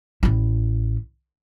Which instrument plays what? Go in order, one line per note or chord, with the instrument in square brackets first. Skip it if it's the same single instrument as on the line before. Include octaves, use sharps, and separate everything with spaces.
[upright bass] A1 E4